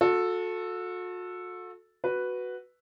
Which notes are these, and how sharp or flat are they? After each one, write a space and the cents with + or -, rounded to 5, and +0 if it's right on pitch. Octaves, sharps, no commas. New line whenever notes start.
F#4 -40 A4 +0
F#4 +0 B4 +0